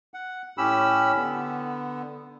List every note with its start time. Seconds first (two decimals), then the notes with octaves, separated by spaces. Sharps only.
0.14 F#5
0.58 A2 C#4 G4 B5 E6
1.15 D3 B3